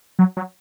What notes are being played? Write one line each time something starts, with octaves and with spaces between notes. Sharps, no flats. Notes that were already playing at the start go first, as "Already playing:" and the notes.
F#3
F#3